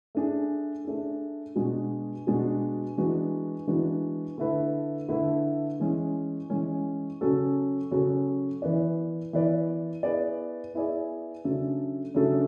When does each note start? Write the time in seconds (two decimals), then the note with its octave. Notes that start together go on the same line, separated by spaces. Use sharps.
0.15 A3 D4 G#4
0.85 A3 D4 G#4
1.55 B2 G#3 D4 F#4
2.27 B2 G#3 D4 F#4
2.97 E3 G#3 B3 D4 F#4
3.67 E3 G#3 B3 D4 F#4
4.38 D3 A3 E4 B4
5.09 D3 A3 E4 B4
5.80 E3 G#3 C#4
6.50 E3 G#3 C#4
7.21 C#3 F#3 C#4 F#4 A4
7.91 C#3 F#3 C#4 F#4 A4
8.62 E3 B3 E4 B4 D5
9.33 E3 B3 E4 B4 D5
10.03 B3 E4 G#4 D5
10.74 B3 E4 G#4 D5
11.45 C#3 F#3 A3 D4 A4
12.15 C#3 F#3 A3 D4 A4